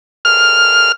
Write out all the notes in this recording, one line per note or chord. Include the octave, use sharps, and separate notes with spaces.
F6